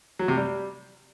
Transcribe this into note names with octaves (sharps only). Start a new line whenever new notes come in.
F#3
C3
G3